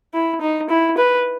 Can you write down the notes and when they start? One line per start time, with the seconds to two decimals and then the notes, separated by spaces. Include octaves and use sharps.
0.14 E4
0.41 D#4
0.70 E4
0.98 B4